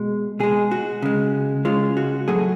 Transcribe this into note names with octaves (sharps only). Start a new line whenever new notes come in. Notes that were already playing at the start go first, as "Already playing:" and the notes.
Already playing: B2 G#3
B2 G#3 G#4
F#4
C#3 G#3
C#3 G#3 F4
F#4
A2 F#3 A3 G#4